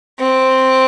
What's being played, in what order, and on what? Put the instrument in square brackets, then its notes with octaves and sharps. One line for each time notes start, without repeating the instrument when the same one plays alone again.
[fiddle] C4